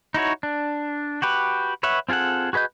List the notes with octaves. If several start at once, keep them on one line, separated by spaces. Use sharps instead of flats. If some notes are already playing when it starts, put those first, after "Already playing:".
D#4 E4 F#4 C#5
D4
F#4 G4 B4
B4 C#5 E5 F#5
C4 F4 G#4 A4 F#5
F#4 G#4 B4 D#5 G6